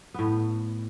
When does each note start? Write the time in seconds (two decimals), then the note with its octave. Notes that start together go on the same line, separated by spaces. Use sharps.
0.14 A2 B3